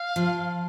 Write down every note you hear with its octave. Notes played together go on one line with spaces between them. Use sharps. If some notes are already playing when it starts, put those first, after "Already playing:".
Already playing: F5
F3